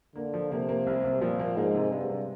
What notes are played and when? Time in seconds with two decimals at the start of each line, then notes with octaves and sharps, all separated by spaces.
0.16 D3 A#3
0.34 F3
0.51 C3 A#3
0.69 A#3
0.87 C2
1.04 C2
1.22 A#2 F3
1.39 A#3
1.57 G#2 G#3
1.74 C3
1.92 G2 G#3
2.10 C3